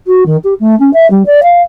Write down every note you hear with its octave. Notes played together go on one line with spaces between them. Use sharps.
F#4
D#3
G4
A3
C#4
E5
G3
D5
F5